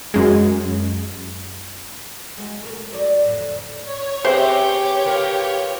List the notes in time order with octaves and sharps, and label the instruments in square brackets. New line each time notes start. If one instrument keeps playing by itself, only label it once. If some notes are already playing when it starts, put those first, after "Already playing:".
[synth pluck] F#2 G#3
[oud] G#3 F#4
B2 A3 A#4
F#3 C5 D5
F2 A2 D3
[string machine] C#5
[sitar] C4 G#4 B4 [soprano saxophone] G4 [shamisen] C5 E5
[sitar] F4 A#4 B4